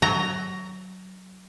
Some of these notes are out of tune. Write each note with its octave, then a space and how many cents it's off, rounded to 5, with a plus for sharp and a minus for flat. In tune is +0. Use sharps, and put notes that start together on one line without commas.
F#3 +15 A#5 +0